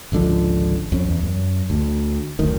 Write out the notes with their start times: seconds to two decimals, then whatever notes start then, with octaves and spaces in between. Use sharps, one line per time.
0.12 G#1 C#2 D3 F3
0.92 F2 C#4
1.08 E2
1.23 F#2
1.70 D2
2.39 F#1 D2 D#3